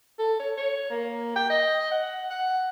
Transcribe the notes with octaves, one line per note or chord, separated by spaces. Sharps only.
A4
C#5
C#5
A#3
G5
D#5
F#5
F#5